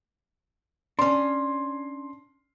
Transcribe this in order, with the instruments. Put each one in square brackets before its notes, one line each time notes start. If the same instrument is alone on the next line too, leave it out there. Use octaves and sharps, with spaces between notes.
[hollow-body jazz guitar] C#4 D4 [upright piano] C6